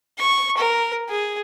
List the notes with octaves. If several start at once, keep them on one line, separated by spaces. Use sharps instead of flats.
C#6
A#4
G#4